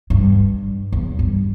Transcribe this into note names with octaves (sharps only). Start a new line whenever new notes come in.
G2
E2
G2